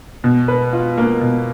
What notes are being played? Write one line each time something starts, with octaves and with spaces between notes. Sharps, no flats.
B2
B4
F4
A#3
B2